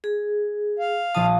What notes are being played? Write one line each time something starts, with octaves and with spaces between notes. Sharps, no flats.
G#4
F5
A#1 F3 A5 D#6